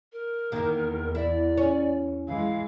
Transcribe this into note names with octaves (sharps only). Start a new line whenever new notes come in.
A#4
E2 D#3 A#3
E4 D5
C#4
E3 G#3 F5